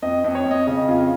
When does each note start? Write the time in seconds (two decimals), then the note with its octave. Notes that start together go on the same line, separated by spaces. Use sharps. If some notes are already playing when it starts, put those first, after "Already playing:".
0.02 F2 D#5
0.24 F2 D#5
0.35 C#5
0.45 F2
0.51 D#5
0.67 C#3 D#5
0.88 F2 F4